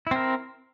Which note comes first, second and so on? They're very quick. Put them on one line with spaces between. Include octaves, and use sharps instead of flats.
E4 C4 A#4